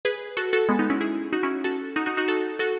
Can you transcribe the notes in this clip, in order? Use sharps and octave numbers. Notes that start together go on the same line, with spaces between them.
G#4 B4
F#4 A4
F#4 A4
G#3 B3
B3 D#4
C#4 E4
E4 G#4
D#4 F#4
C#4 E4
F#4 A4
D#4 F#4
D#4 F#4
D#4 F#4
F#4 A4
F#4 A4